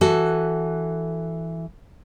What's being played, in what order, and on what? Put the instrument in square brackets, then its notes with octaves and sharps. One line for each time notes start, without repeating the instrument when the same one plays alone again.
[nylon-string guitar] E3 F#4 A4